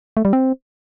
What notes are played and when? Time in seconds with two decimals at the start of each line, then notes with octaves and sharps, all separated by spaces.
0.17 A3
0.25 G3
0.33 C4